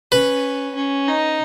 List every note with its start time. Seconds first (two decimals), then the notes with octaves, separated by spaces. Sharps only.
0.12 C#4 B4
0.75 C#4
1.08 D#4